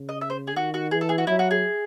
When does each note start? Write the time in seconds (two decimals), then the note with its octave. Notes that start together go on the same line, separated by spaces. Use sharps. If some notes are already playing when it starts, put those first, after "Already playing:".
Already playing: C#3
0.09 D#5
0.21 E5
0.30 C5
0.47 G#4
0.56 D#3 F#4
0.74 F#4
0.91 E3 G#4
1.01 A4
1.09 G#4
1.18 F#4
1.27 F#3 E4
1.39 F#4
1.51 G#4